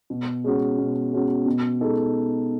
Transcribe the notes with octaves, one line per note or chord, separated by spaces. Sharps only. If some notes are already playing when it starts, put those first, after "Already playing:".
B2
G#3 C#4 F#4
B2
G#3 C#4 F#4
B2
G#3 D#4 A4